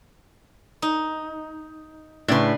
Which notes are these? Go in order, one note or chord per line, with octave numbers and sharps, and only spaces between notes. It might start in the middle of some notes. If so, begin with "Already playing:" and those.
D#4
A2 C#3 D4 B4 C6